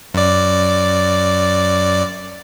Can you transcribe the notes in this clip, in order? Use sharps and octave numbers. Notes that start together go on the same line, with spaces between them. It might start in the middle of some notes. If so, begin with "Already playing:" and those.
F#2 D5